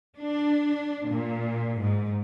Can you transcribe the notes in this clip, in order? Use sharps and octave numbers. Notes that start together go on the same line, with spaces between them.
D4
A#2
G#2